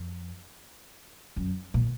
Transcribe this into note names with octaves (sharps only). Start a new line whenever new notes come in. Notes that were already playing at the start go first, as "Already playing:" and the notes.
Already playing: F2
F#2
A#2